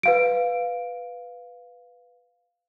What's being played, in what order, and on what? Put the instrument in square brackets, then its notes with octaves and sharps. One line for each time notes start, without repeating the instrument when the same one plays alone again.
[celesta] B4 F5 D7